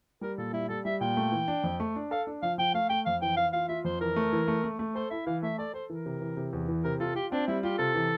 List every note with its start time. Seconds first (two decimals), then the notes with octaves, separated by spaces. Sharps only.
0.21 G3 A#4
0.38 A#2 A4
0.53 G3 E4
0.69 G3 A4
0.85 G3 E5
1.01 A#2 G5
1.17 A3
1.32 E3
1.48 D4
1.64 F2
1.80 A3
1.96 D4
2.11 A4 F5
2.27 D4
2.42 F3 F5
2.58 F3 G5
2.74 A3 F5
2.89 A3 G5
3.06 F2 F5
3.22 E3 G5
3.37 E3 F5
3.53 F4 F5
3.69 F4 E5
3.84 F2 C5
4.01 E3 A#4
4.16 A3
4.33 E3
4.48 A3
4.64 A3
4.79 A3
4.95 A4 C5
5.11 E4 E5
5.26 E3 F5
5.42 A3 E5
5.59 A4 D5
5.74 A4 C5
5.90 E3 A#4
6.06 C3
6.21 E3
6.37 C3
6.53 E2
6.68 E3
6.84 C3 A#4
7.00 F4 A4
7.15 F4 G4
7.32 C4 D4
7.48 G3 E4
7.63 F4 G4
7.78 C3 A4
7.95 E3